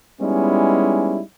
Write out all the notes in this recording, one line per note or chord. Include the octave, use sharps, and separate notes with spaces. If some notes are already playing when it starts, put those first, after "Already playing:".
G3 G#3 B3 C#4 D#4 E4